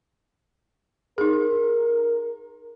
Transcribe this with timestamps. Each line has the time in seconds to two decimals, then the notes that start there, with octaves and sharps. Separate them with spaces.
1.18 D#4 G#4 A#4